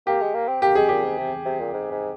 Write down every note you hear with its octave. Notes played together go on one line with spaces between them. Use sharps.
A#3 G4
G#3
A#3
C4
A#3 G4
G#3 G#4
A#2 G4
G#2
C3
C3
A#2
G#2
G#2